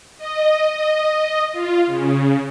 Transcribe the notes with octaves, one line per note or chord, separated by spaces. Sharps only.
D#5
D#5
F4
C#3